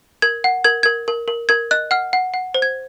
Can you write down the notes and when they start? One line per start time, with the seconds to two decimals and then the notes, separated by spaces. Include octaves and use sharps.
0.22 A#4 G#6
0.44 F#5
0.64 A#4 G#6
0.83 A#4 G#6
1.08 A#4
1.28 A#4
1.49 A#4 G#6
1.71 D#5 F#6
1.91 F#5 F6
2.13 F#5
2.34 F#5
2.54 C5
2.62 G#6